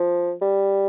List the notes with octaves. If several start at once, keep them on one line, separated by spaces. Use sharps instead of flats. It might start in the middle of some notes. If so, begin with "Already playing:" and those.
Already playing: F3
G3